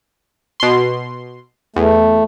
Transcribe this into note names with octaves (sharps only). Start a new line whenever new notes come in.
B2 C6
E2 A3